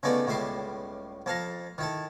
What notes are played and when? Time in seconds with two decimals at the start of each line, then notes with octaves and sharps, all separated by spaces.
0.03 C#3 G#3 A3 B3 D#4 D5
0.27 C#2 A2 G3 E5 C6 D6
1.26 F2 A4 F5 A#5
1.78 D#3 E4 A4